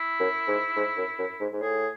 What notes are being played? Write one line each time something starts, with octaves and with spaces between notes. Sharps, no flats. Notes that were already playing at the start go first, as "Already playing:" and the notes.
Already playing: E4
F#2
G#2
G#2
F#2
F#2
G#2
G#2
A2 G#4